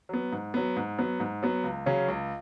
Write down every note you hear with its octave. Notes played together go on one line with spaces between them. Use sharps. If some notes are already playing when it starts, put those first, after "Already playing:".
F#3 B3
G#2
F#3 B3
G#2
F#3 B3
G#2
F#3 B3
C#2
C#3 F#3 C#4
C#2